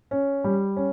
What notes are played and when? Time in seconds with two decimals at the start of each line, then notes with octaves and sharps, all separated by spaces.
0.11 C#4
0.44 G3
0.76 C#4